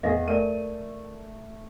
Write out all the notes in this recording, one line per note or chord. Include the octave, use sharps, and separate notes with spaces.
E2 G#4 D#5 F5 A#6
A3 A#4 D5 D#7